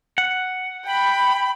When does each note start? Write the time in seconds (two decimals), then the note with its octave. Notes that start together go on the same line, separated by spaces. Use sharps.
0.18 F#5
0.86 G5 B5